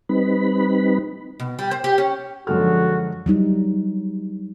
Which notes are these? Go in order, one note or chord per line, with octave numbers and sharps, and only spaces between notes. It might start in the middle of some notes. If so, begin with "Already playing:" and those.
G3 C4 D#4 B4 B5
B2
G3
C5
G4
C#4
F#2 D3 F3 G#3 F#4 A4 F6
F#3 G3 D#4